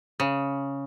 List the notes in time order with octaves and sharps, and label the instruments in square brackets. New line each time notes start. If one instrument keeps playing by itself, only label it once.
[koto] C#3